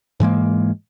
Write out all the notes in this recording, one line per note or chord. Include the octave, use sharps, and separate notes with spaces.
G#2 E3 G#3 A#3